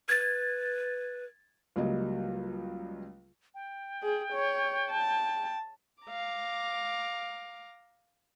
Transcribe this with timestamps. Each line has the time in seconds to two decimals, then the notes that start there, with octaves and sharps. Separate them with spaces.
0.09 B4 G#6 A6
1.76 C#2 F#3 G3 A#3 D#5
3.55 G5
4.03 G#4
4.33 C#5
4.91 A5
6.03 F5 A#5 D6